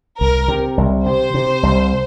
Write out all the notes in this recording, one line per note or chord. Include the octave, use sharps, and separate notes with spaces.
C2 A#4
C3
C2
C3 C5
C3
C2